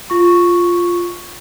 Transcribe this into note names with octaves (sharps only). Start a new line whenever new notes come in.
F4 C#6